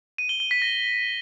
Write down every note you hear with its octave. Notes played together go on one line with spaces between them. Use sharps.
D#7
G7
G7
B6
A#6